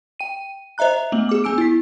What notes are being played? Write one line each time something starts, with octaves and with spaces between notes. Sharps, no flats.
G5 D#7
C5 D#5 E5 A#5 F#6
A3 B3 F#7
G#4 D6
B3 G#5 E6 D7
E4 B6